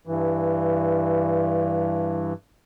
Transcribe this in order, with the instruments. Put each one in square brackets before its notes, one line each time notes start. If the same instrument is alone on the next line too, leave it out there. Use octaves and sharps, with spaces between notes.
[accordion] G2 E3